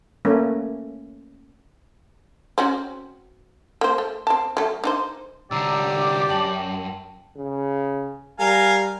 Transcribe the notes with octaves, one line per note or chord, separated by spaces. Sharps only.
A3 A#3 C#4
C4 C#4 F#4
A#3 C5
A3
C4 A5
F#3 A3
D4 D#4 C5
C2 D3 G4 D5 A#5 E6
F#2 G5 A5 F#7
C#3
G3 A#4 F5 G#5